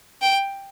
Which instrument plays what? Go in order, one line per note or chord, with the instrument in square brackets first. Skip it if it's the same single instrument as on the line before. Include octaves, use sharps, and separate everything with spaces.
[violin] G5